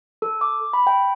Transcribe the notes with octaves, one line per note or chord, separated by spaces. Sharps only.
A4
D6
B5
G5